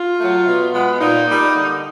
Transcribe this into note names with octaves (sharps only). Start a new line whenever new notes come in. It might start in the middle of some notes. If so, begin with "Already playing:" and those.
Already playing: F4
F#3 A3
B2
G#3 B3
A#2 D#4
G3 A#3
D3